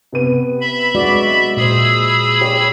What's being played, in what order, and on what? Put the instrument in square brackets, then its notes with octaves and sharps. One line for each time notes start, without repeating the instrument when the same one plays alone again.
[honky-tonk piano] C3 B3 D#7
[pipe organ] E5 B5
[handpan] G#3 F#4 D5
[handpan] A#2 C5 [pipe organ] G#4 B5 E6
[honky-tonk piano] G4 C#5